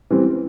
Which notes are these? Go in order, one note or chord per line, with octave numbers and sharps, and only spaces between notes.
E3 G3 C4